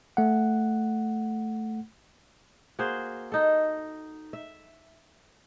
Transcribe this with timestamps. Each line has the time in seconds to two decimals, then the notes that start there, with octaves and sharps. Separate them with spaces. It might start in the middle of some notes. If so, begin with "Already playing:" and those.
0.17 A3 F#5
2.79 A#3 F#4 G#4 C5
3.32 D#4 A4
4.33 E5